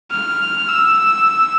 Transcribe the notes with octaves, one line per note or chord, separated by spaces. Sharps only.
F6
E6